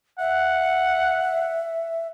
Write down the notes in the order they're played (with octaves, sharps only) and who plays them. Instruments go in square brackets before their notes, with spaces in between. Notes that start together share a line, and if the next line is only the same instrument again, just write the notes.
[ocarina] E5 [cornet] F#5